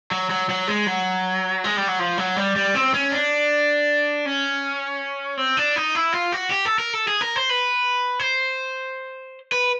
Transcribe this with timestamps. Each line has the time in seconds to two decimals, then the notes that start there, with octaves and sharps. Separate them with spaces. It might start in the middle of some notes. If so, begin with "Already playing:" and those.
0.11 F#3
0.30 F#3
0.49 F#3
0.68 G#3
0.87 F#3
1.64 G#3
1.77 G3
1.88 F#3
1.99 F3
2.18 F#3
2.36 G3
2.56 G3
2.75 C4
2.94 C#4
3.12 D4
4.26 C#4
5.37 C4
5.57 D4
5.76 D#4
5.95 E4
6.13 F4
6.32 F#4
6.51 G4
6.65 A4
6.79 A#4
6.93 A4
7.08 G#4
7.21 A#4
7.36 C5
7.49 B4
8.20 C5
9.52 B4